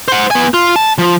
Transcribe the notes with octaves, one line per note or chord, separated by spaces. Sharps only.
C5 F#5
B3 G#5
F4
A5
F3